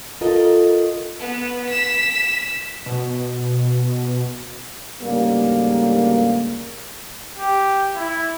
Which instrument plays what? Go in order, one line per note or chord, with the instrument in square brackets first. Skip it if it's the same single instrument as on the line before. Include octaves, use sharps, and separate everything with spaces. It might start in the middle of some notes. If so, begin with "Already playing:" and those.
[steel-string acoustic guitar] F4 A4 A#4 D#5
[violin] B3
B6 E7
[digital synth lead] B2
[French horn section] D2 G#2 C#3 G3 A#3
[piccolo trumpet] G4
E4